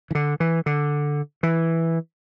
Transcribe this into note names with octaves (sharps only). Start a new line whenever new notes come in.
E3
D3
E3
D3
E3